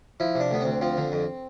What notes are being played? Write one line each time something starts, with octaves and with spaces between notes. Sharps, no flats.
F3 E4
C3
D4
D2 B3
D2 C4
F3 C4
D3
F2